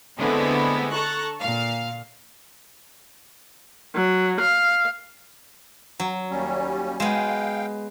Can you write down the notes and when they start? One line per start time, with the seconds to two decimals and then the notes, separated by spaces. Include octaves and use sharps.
0.17 D3 G#3 A3 B3 C4 E4
0.93 A4 A5 A#5 C#6 F#6
1.41 A#2 F5
3.95 F#3
4.40 F5
6.00 F#3
6.31 D#2 G3 C#4
7.00 G#3 B3 F5 G5